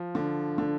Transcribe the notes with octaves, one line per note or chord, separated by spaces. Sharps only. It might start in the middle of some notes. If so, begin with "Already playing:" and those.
Already playing: F3
D3
D3